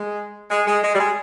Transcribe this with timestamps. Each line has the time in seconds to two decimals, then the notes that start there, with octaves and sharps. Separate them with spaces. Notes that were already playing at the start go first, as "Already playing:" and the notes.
Already playing: G#3
0.50 G#3
0.67 G#3
0.83 G#3
0.94 G3
0.99 G#3